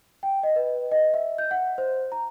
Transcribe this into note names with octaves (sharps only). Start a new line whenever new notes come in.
G5
D#5
B4
D#5
E5
G6
F#5
C5
A#5